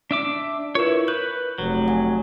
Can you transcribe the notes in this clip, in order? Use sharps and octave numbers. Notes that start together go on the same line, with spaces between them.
D4 E5 D6
E4 F4 A#4 B4 C#5
B4 G6
F1 F#3
F#5 G#5